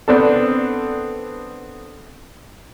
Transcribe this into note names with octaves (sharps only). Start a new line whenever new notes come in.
B3 C4 D4 A4